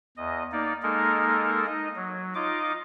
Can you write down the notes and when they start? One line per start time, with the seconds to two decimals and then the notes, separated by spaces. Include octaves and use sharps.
0.17 E2 D#5
0.52 A#3 D#4 D5
0.83 G#3 A#3 D#4 A4 A#4
1.67 D#4 D#5
1.96 F#3
2.35 D#4 F4 D#5 D6